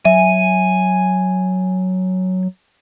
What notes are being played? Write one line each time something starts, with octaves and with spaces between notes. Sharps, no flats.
F#3 E5 G#5